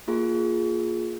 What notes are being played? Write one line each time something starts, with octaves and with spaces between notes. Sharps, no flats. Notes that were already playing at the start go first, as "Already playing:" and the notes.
A#3 F4 G#4